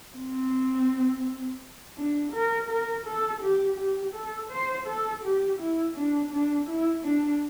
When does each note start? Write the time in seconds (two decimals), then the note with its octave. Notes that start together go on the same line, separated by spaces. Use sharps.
0.15 C4
1.97 D4
2.32 A#4
2.69 A#4
3.05 A4
3.41 G4
3.78 G4
4.14 A4
4.50 C5
4.86 A4
5.23 G4
5.59 E4
5.96 D4
6.32 D4
6.67 E4
7.04 D4